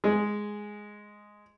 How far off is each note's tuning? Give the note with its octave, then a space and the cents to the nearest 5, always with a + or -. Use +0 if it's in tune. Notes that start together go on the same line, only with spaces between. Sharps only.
G#3 +0 G#4 +0